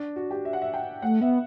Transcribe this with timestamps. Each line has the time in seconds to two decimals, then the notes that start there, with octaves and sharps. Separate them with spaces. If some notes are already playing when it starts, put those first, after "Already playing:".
Already playing: D4
0.16 F#4
0.31 G4
0.45 E5
0.53 F#5
0.62 E5
0.74 G5
1.02 A3 F#5
1.21 B3 E5